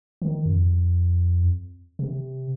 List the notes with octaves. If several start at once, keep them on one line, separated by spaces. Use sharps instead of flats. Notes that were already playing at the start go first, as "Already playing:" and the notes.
D#3
F2
C3